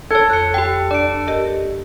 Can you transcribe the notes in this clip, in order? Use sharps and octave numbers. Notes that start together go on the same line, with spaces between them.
A4 C#5 G#6
F2 F#6 C#7
G4 G5
D4 D5 D7
G4 A#4 D#5